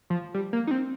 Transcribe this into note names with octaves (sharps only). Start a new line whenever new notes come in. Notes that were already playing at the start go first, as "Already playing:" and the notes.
F3
G3
A#3
D#4
C4